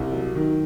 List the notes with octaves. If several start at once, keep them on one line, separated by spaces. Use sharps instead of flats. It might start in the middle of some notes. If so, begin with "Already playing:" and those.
Already playing: C2
F#3
D#3